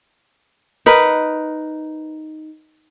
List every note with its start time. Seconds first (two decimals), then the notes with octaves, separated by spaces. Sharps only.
0.86 D#4 A#4 B4